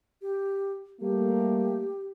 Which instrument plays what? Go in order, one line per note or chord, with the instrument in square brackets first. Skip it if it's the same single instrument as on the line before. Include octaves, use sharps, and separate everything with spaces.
[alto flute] G4
[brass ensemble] G3 A3 A#3 [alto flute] G4